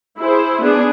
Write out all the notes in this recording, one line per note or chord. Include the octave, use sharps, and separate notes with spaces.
E4 G#4 C5
B3 D4 G#4